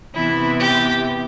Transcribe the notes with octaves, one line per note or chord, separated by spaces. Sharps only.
C3 E3 B3 E4
G4